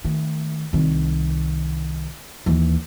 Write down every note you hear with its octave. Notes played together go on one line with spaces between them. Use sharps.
D#3 A3
C2 D#3
D#2 E3